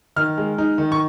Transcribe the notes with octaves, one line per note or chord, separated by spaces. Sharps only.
D#3 F6
G#3
D#4
D#3
C#6